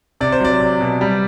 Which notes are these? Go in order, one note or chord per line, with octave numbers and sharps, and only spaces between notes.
C3 D5
C5
F#3 D5
C3
B2
G3